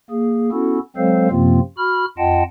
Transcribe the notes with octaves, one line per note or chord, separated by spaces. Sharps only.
A#3 G#4
B3 C#4 E4 F#4 A4
F#3 G#3 C4 A4 C5 F5
F#2 C3 F3 A#3 C4 F4
F#4 B5 F6
F2 F4 D#5 F#5 G5 A5